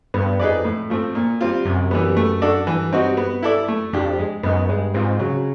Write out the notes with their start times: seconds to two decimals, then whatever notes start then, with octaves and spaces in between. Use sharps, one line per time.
0.14 G2 B3
0.39 F2 D#4 G#4 B4 D5
0.65 A2
0.90 F3 A3 C4
1.15 A#2
1.41 G3 C4 F4
1.65 F#2 C3
1.91 E3 G3 B3
2.17 A3
2.42 D4 F#4 A4 D5
2.67 G2 E3
2.92 G3 C4 D#4 F#4
3.17 B3
3.43 E4 A4 D5
3.68 F#2 A3
3.93 F2 D4 G4
4.19 G#3
4.43 F#2 B3 D#4
4.69 G2 G#3
4.94 G#2 C4 F4
5.19 C#3 F#3